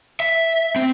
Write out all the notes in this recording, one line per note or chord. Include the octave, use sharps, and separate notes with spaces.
E5
C4